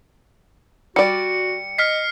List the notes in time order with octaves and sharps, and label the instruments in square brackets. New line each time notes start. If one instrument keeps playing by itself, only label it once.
[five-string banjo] G3 D5 [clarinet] F#4 [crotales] C#7
[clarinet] D#5 [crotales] F6 B6 C7